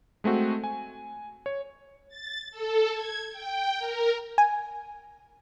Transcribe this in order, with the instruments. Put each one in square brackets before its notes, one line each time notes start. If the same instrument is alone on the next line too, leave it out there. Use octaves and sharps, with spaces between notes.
[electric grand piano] G#3 A3 C4 F#4
G#5
C#5
[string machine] A6
A4
G#6
G5
A#4
[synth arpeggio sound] G#5